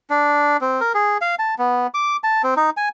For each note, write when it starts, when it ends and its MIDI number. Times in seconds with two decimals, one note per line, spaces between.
0.10 0.57 62
0.61 0.80 60
0.81 0.92 70
0.94 1.18 68
1.21 1.35 77
1.39 1.55 81
1.59 1.87 59
1.94 2.17 86
2.24 2.42 81
2.44 2.54 60
2.57 2.70 63
2.77 2.89 80